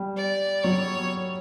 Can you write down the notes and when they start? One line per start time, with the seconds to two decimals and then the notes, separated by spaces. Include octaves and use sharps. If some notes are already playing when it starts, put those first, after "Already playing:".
Already playing: G3
0.17 D5
0.64 F#3 C#5